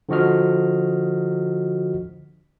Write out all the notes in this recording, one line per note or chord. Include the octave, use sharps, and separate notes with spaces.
D3 F3 F#4 D#5 F6